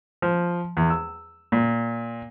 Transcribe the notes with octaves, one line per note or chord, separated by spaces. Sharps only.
F3
E2
E6
A#2